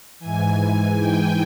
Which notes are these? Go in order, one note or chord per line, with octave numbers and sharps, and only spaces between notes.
G#2 E3 G#5
G5